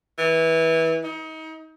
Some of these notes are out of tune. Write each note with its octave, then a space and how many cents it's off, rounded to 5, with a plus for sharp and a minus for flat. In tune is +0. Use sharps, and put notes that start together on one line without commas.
E3 -20
D#4 +35